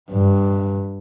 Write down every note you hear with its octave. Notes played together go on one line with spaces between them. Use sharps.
G2